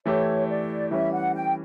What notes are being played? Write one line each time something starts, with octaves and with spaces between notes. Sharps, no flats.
E3 A3 E4 G4 C#5
D5
E3 G3 C#4 E5
F#5
G5